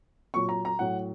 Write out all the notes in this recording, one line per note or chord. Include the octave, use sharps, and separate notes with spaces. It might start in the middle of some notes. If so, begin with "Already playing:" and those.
A#2 F#3 C#6
A#5
A#5
A2 F#3 F#5